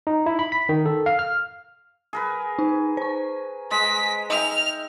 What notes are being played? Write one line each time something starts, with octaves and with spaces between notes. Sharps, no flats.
D#4
E4
B5
B6
D#3
A4
F5
F6
G#4 A#4 B4
D#4
C5 C#6
G#3 D#5 B6
D#4 D#5 E5 G5 F6